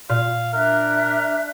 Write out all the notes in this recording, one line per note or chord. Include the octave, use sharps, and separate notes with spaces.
A#2 F5
D4 A#4 E5 F#6